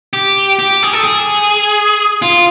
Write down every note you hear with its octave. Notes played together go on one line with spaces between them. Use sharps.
G4
G4
G#4
A4
G#4
F4